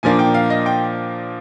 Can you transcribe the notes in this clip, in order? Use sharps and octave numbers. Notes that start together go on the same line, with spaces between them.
A#2 F3 A#3 D4 G#5
G5
F5
D#5
G5